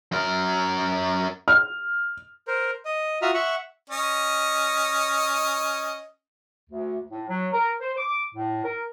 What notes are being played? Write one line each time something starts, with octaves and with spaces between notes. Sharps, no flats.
F#2 A#4
F6
A#4 C5
D#5
F4 F#4 E5 A#5 D#6 F6
E5 F#5 C#6
C#4 D#5
D2
A2
F#3
A#4
C5
D6
A2
A#4